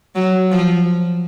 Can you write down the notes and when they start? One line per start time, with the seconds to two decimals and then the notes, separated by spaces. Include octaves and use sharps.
0.15 F#3
0.51 F3